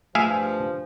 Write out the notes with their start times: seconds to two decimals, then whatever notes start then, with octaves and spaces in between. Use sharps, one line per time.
0.15 G2 F3 A3 G#4 E5 F5 G#5